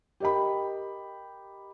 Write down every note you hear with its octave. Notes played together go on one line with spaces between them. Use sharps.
G4 A#4 D#5 G5 B5